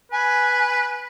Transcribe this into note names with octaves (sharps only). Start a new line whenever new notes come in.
B4 G#5